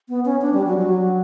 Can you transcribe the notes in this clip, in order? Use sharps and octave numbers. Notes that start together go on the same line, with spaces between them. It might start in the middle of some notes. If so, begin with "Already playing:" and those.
B3
C#4
D4
G3
F#3
F#3